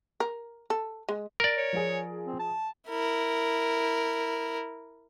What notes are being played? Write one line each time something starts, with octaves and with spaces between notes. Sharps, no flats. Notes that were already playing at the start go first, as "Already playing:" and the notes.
A#4
A4
G#3
A#4 D5
C#5
F3 F4 G#4
C4
A5
E4 A#4